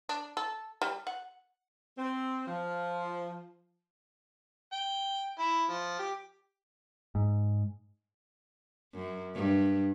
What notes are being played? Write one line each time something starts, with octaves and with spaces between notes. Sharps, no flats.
D4
A4
G3
F#5
C4
F3
G5
E4
F3
G4
G#2
F#2
G2